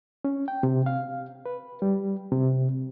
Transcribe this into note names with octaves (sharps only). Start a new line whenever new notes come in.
C#4
G5
C3
F5
B4
G3
C3